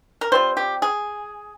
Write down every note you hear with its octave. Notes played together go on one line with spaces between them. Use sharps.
A#4
G3 C4 F4 C5
G4
G#4